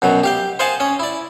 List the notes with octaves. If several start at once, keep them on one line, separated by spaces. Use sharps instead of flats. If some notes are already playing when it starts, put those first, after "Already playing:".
F#2 B2 F#3
G4 F5 G5
C5 D#5 F5 F#5 G#5 A5
C#4 D#5
E4 D5